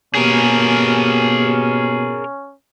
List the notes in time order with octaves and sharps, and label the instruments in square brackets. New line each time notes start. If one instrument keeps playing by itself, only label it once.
[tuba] B2 [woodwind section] A#3 G4 [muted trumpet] C#4 [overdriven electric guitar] G#4 A#4